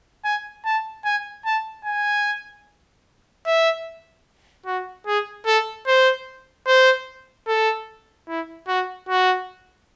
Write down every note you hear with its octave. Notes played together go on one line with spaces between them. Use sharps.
G#5
A5
G#5
A5
G#5
E5
F#4
G#4
A4
C5
C5
A4
E4
F#4
F#4